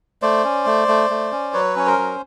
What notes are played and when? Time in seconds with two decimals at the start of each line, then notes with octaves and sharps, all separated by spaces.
0.22 A3 C5 D5
0.44 C#4
0.66 A3
0.88 A3
1.10 A3
1.32 C#4
1.54 F#3 B4 C#5
1.76 C#4 C#5
1.87 A#4 C5
1.98 F#3